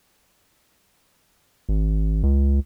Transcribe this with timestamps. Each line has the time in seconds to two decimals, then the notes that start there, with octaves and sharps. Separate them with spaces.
1.69 G#1
2.23 C#2